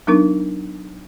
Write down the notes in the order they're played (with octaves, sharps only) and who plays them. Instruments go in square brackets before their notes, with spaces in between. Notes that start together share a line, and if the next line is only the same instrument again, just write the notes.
[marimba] F#3 B3 D4 D#4 A#4